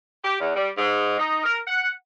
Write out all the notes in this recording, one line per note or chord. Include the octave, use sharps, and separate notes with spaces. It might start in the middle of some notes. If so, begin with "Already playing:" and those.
G4
E2
G3
G#2
D#4
A#4
F#5